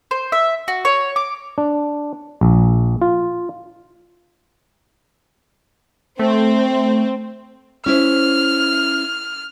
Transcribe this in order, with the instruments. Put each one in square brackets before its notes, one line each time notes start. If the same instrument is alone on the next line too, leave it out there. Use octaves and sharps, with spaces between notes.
[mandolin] C5
E5
F#4
C#5
D6
[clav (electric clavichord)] D4
A#1
F4
[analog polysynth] A3 [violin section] C4
[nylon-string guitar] C#4 E4 C5 [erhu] F6